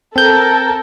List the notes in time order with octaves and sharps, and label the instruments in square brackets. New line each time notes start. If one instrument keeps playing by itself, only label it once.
[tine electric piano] C4 G6 [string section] A4 A#4